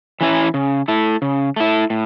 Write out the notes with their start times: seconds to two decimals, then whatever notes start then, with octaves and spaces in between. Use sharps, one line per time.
0.21 E3 C#4 E4
0.54 C#3
0.88 A3 E4
1.22 C#3
1.56 A3 E4
1.90 A2